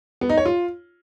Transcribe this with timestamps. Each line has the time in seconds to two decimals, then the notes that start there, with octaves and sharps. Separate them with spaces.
0.21 B3
0.29 D#4
0.37 C#5
0.46 F4